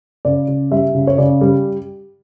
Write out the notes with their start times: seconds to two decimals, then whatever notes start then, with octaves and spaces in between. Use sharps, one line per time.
0.25 C#3 D5
0.48 C#3
0.71 G3 E5
0.94 C#3
1.07 C#5
1.18 C#3 D5
1.41 G3